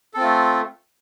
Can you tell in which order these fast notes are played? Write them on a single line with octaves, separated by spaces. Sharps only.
A4 C4 F4 A3